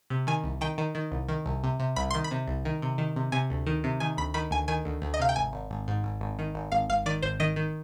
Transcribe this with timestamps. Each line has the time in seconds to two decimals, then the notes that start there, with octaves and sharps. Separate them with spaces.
0.10 C3
0.27 D#3 G#5
0.44 C2
0.61 D#3 G5
0.78 D#3
0.95 D#3
1.12 C2
1.29 D#3
1.46 C2
1.64 C3
1.80 C3
1.96 C2 B5
2.11 D#3 C6
2.24 B5
2.31 C3
2.48 C2
2.65 D#3
2.82 C3
2.98 D#3
3.16 C3
3.32 C3 G#5
3.50 D2
3.67 D#3
3.84 C3
4.00 D#3 G#5
4.17 D2 B5
4.34 D#3 B5
4.51 D2 G#5
4.68 D#3 G#5
4.85 D2
5.02 D2
5.14 D#5
5.19 C3 F5
5.29 G5
5.36 G#1 G#5
5.53 G#1
5.71 G#1
5.88 G#2
6.04 G#1
6.21 G#1
6.39 D#3
6.55 G#1
6.72 G#1 F5
6.90 G#1 F5
7.06 D#3 D5
7.22 G#1 C5
7.40 D#3 D#5
7.56 D#3